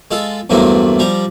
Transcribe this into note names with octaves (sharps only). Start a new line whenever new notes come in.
G#3 F4 A4
E2 G2 F#3 A3 A#3 C4
F3 G3 A#5